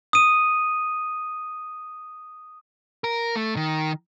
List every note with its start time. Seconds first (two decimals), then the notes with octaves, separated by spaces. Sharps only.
0.13 D#6 D#7
3.04 A#4
3.36 A3
3.56 D#3